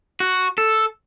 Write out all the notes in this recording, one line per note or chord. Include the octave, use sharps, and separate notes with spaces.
F#4
A4